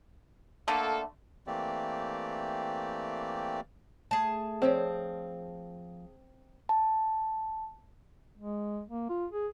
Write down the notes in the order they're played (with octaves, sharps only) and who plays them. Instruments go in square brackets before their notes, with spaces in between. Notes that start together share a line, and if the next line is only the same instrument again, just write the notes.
[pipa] D3 A3 [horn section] A#3 A4
[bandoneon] E3 A3 A#3 C4 G4 D5
[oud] A3 [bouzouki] G#4 A5
[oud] F3 C#5 D5 [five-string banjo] C4
[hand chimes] A5
[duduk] G#3
A#3
F4
G#4